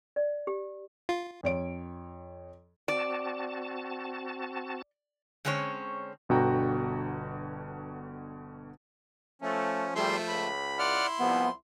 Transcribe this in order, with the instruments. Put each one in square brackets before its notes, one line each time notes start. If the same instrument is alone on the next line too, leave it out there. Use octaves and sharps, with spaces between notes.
[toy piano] D5
G4
[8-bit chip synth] F4
[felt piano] F2 C#5 D7
[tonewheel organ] C4 F#4 A5 [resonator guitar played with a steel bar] D5
[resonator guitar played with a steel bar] D3 G#3 C4 C#4 C#5
[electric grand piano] G1 B2 D3 F#4 G5 A#5
[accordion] F3 C#4 [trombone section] A3
[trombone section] G#1 C3 G#4 [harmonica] F3 A3 [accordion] G3 C6
[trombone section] C#2 [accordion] B5
[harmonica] E4 C6 [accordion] D5 F#5 F6
[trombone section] C2 [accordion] F3 [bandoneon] B3